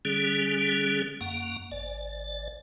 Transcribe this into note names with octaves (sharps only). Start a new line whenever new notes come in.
D3 G3 C#4 G#4
F#2 A#3 F#5
G#1 D5